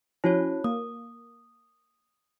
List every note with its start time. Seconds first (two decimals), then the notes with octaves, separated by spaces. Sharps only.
0.24 F3 C#4 E4 F#4 C#5
0.64 A#3 D#6